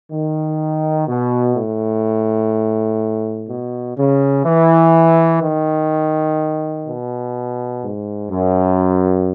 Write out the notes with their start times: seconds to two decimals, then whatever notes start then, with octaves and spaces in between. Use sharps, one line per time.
0.12 D#3
1.08 B2
1.56 A2
3.49 B2
3.98 C#3
4.46 E3
5.43 D#3
6.87 B2
7.83 G#2
8.31 F#2